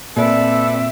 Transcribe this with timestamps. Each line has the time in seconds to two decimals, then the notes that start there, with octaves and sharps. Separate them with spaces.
0.17 A#2 C4 A4 B4 D5 E5